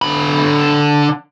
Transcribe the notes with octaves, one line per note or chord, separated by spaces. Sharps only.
D3 B5